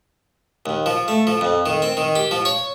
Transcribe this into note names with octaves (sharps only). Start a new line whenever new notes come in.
D#2
F3
A3
F3
F2
D#3
C4
D#3
G4
F3
C#5